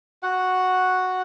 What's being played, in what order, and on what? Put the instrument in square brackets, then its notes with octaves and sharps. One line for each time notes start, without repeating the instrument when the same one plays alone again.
[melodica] F#4 F#5